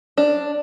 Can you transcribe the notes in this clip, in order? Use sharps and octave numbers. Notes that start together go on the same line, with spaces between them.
D4